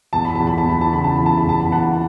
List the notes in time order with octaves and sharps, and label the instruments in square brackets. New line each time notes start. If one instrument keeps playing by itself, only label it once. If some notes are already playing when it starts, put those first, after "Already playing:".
[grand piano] E2 A5
B5
E2 A5
B5
A5
E3 B5
A5
C#3 B5
A5
B5
E2
A5
B5
E2 A5
B5
E3 F#5 A5